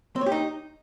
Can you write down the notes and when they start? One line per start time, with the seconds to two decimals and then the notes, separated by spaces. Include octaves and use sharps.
0.16 C4
0.21 C#5
0.26 G4
0.32 D#4